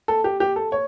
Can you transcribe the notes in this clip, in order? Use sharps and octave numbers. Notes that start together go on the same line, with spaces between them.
A4
G4
G4
A4
C#5